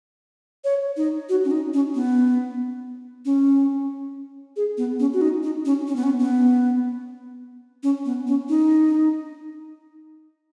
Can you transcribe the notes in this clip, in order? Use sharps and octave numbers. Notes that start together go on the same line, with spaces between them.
C#5
D#4
F#4
C#4
D#4
C#4
B3
C#4
G#4
B3
C#4
F#4
D#4
D#4
C#4
C#4
B3
C#4
B3
C#4
B3
C#4
D#4